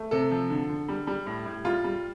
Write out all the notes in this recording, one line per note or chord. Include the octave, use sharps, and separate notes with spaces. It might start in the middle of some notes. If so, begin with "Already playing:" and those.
Already playing: A3
C3 A4
F3
D3
D3
G3
G3
A2
A2
G3 F4
G3